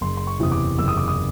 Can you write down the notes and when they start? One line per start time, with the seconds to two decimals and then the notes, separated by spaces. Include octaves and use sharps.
0.01 F#1 C6
0.17 C6
0.27 C#6
0.40 E2 C3 E3 D#6
0.52 D6
0.78 F#1 E6
0.88 D#6
0.97 D6
1.08 D#6